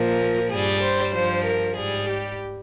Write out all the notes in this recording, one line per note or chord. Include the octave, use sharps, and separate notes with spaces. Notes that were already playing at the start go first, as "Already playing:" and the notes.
Already playing: A#2 F3 A#4
G2 G3 G#4
C5
G2 F3 C5
A#4
G#2 G3 G#4
G4